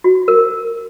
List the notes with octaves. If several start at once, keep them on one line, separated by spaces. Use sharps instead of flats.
F#4
A#4